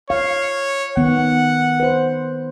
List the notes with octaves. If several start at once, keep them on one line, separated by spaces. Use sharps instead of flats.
C#5 F5
D#3 B3 F#5
B4 C5